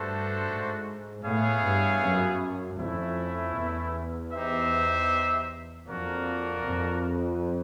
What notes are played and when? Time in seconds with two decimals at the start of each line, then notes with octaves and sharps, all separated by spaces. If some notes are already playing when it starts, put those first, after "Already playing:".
Already playing: G2 A3 D4 F#4 A4 C5
0.48 G#2
1.24 A2 B3 E4 G#4 C#5 F5
1.63 G2
2.01 F#2
2.78 F2 A3 C#4 E4
3.56 E2
4.32 D#4 G4 C5 E5
5.86 F2 A#3 D4 F#4 A#4 D5
6.64 F2